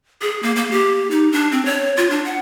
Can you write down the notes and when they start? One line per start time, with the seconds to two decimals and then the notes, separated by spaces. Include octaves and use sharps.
0.22 G#4
0.43 A#3
0.56 A#3
0.71 G4
1.11 D#4
1.32 D4
1.52 C4
1.65 C#5
1.97 F4
2.10 D4
2.25 F#5